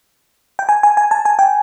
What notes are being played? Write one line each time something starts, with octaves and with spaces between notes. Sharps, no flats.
G5
G#5
G#5
G#5
A5
G#5
G5